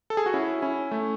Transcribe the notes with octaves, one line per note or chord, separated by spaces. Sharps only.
A4
G#4
F#4
C#4 E4
C#4 E4
A3